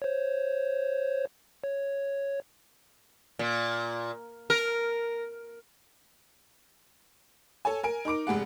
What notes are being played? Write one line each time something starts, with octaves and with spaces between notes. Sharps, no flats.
C5 C#5
C#5
A#2
A#4
A4 C#5 G#5
A#4 G#5 D7
D#4 A#4 D6 D7
F1 G#2 G#4 F#5